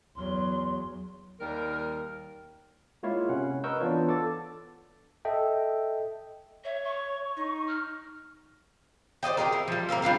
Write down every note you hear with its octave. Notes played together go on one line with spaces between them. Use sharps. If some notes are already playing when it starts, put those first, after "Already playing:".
E2 F#3 C6
D#2 G3 A#4
G#3 A#3 E4 F4 C#5 F5
C3 C#4 F#5
A#4 B4 D#5 C#6 E6 G6
E3 B3 D4 F4 C#5
A4 D6 A6
A4 D#5 E5 G5
C#5 E5
C#6
D#4
F6
C5 D5 D#5 G5
G4 G#4 A#4
E4
F3 G3
A#3 C4 E4 A#4
G3 D4 F4 A#4